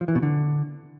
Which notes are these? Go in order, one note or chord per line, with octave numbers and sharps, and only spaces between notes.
F3
E3
B2
D3